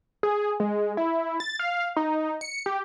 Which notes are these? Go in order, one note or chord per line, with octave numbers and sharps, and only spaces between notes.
G#4
G#3
E4
A6
F5
D#4
C#7
G4